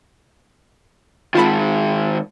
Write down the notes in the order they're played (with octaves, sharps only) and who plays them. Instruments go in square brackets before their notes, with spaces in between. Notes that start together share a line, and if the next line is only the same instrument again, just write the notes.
[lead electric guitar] D#3 G#3 [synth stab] F4 A5 B5